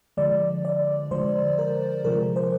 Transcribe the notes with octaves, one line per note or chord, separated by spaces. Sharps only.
D3 F3 G#3 D5
D5
D3 F3 G#3 C5
A#4
C3 F3 G#3 A#4
C5